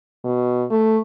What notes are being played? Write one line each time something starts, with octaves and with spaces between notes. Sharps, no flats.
B2
A3